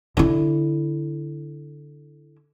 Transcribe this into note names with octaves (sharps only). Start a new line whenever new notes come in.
D3 E4